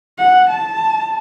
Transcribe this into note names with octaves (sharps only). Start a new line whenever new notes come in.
F#5
A5